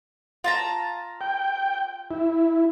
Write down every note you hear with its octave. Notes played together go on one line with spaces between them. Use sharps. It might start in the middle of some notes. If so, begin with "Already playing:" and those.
F4 A5 A#5
G5
E4